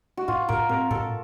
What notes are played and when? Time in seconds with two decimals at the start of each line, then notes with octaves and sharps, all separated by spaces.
0.17 F#4
0.28 A2 F4
0.49 A2 A#4
0.69 C4 A#4
0.90 A2 A4